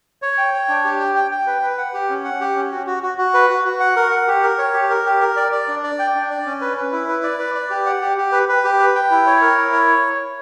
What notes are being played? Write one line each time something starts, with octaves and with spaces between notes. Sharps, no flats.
C#5
G5
C#5
D4
G4
G5
G5
G5
B4
B4
F#5
G4
C#4
F#5
G4
C#4
F#4
F#4
F#4
F#4
B4
F#4
F#4
F#5
A#4
F#5
G4
A#4
C#5
G4
A#4
G4
A#4
D5
D5
D4
D5
G5
D4
D5
C#4
B4
B4
E4
B4
D5
B4
D5
G4
F#5
G4
G4
B4
B4
G4
B4
G5
E4
C#5
A#4
E4
C#5